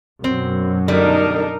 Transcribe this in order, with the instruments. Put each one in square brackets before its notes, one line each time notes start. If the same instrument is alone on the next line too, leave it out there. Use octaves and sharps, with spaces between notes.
[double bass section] F#2 B2 [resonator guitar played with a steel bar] C4
[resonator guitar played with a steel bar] D3 G3 A3 [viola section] D4 D#4 A#4